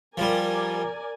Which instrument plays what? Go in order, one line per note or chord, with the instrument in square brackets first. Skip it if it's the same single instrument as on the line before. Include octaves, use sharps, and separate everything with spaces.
[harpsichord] F3 G3 [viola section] A#4 D5 G#5